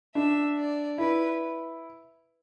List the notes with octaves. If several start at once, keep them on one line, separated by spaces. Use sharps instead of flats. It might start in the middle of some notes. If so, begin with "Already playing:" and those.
D4 E5
D5
E4 B4